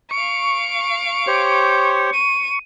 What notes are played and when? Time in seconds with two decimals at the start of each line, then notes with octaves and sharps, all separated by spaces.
0.11 F5 C#6 D7
1.27 G4 C5 C#5
2.13 D#7